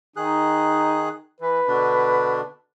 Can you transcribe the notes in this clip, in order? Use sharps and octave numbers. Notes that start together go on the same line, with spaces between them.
D#3 D#4 G#4 F#6
E3 B4
B2 D3 D4